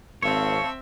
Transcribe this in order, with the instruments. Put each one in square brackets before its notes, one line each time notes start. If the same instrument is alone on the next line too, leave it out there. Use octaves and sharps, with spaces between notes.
[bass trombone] G#1 [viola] C4 E5 [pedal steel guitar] C#5 [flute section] F5 A5